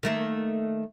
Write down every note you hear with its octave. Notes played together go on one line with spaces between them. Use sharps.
D#3 A3 A#3